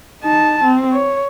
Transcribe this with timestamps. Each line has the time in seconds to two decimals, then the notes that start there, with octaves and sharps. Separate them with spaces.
0.22 D#4 A5
0.63 C4
0.92 C#5